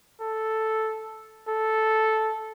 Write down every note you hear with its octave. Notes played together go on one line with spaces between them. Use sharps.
A4
A4